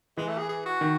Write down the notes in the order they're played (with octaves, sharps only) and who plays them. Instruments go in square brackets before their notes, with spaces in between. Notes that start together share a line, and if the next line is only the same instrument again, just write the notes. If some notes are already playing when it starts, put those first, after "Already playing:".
[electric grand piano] E3 [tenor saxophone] G#3
[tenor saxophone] A3
G#4
G#4
F#4
[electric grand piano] D#3